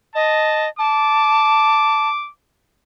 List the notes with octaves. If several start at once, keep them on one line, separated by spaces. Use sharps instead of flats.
D#5 A5
A5 D6